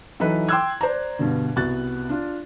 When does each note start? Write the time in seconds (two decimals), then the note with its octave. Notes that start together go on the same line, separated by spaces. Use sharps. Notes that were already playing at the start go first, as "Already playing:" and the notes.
0.20 E3 F#3 D#4 A4 B4
0.49 G5 C6 D6 E6 F#6 G#6
0.81 C5 D5 A#5
1.19 G2 B2 D3
1.56 C2 B3 F#4 F#6 A6
2.09 D4 F4